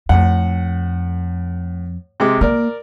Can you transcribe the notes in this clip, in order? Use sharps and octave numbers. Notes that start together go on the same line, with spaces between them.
F2 A2 F#5
C3 G#3 D6
A#3 A#4 D5